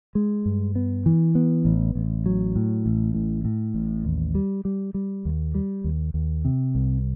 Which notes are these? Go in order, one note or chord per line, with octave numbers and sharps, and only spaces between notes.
G#3
G2
B3
E3
B3
A1
A1
F#3
A2
A1
A2
A2
A1
D#2
G3
G3
G3
D#2
G3
D#2
D#2
C3
C2